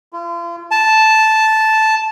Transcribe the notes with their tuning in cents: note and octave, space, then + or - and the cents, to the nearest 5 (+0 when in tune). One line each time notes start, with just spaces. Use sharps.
F4 -40
A5 -5